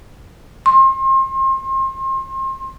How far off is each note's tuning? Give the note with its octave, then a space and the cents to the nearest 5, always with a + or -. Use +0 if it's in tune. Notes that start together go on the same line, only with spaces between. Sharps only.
C6 +35